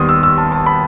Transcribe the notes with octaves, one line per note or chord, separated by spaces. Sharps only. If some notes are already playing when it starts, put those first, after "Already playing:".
Already playing: D#2 D#3 G3 B3 C6 D#6
E6
E6
A5
A5
B5